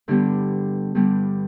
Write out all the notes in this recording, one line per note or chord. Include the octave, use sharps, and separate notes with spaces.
G2 D3 G3 B3
G2 D3 G3 B3